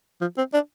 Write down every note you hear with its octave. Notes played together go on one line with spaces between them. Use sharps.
F3
C4
D4